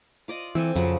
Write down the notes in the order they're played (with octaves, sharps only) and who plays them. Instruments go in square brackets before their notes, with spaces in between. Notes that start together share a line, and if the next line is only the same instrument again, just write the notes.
[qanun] F4 D5 D#5
[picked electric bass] E3 [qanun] C4 A4 G#5
[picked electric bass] F2 [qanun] C#3 F3 F#3